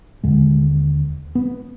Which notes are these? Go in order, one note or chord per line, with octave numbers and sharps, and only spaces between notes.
D#2 D3 G#3
B3